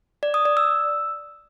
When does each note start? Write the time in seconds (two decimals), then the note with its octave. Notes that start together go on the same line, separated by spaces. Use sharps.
0.23 D5
0.34 D#6
0.45 D5
0.57 E6